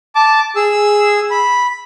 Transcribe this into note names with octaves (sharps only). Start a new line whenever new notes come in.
A5 D6
G#4 E6
B5